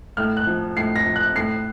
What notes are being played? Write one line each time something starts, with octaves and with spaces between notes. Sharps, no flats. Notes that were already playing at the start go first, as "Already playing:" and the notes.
A2 F6
F#6
F3
A2 C7
A#6
F3
F#6
A2 C7